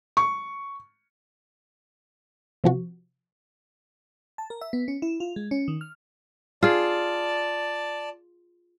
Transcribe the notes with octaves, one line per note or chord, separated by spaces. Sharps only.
C#6
C3 F3 F#4
A5
A#4
E5
B3
C#4
E4
F4
G#3
C#4
D#3
F6
F4 G#4 D5 A5